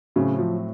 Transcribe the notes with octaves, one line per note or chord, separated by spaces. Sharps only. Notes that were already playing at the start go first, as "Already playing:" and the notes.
A2 C#3 F#3 C4
F3